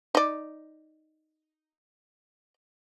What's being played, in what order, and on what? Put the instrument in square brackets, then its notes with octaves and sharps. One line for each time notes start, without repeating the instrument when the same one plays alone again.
[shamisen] D#4 D5